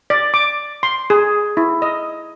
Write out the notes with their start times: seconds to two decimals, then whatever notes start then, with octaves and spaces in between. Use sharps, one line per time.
0.10 D5
0.34 D6
0.83 C6
1.10 G#4
1.57 E4
1.82 D#5